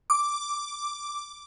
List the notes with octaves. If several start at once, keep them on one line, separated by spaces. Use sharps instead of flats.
D6